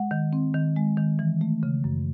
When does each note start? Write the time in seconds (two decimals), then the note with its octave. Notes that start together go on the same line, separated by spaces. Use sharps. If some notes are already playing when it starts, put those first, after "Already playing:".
Already playing: G#3 F#5
0.11 D#3
0.33 C4
0.54 D#3
0.76 G#3
0.97 D#3
1.19 E3
1.41 A3
1.63 C#3
1.84 F#2